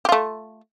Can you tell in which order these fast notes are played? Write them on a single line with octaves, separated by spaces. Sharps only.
G4 F4 A3